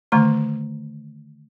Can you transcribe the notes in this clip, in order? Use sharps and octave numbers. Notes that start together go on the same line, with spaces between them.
D3 D#3 A3 A#5